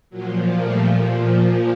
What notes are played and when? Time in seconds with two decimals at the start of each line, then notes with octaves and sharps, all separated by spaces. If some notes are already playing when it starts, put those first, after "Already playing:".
0.10 A#2 F3 F#3
0.60 G3 A3